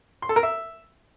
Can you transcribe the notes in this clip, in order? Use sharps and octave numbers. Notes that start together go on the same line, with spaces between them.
C6
A4
A#4
E5